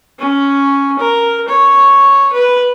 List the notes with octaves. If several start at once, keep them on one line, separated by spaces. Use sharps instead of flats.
C#4
A#4
C#5
B4